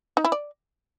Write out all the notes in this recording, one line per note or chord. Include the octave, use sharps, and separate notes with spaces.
D#4
E4
D5